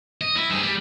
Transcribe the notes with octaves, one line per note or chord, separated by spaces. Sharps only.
D#5
E4
G2 G#4
G3